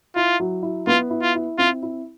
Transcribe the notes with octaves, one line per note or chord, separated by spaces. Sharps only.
E4 F4
F#3
E4
B3 F4
E4
F4
E4
C4 F4
E4